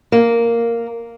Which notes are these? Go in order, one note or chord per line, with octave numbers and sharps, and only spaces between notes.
A#3